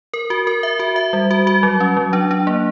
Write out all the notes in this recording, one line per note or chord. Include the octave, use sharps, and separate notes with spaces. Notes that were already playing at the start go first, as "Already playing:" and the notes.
A#4
F#4
A#4
E5
F#4
E5
G3
F#4
F#4
F#3
C#4
F#3
D4
D4
A#3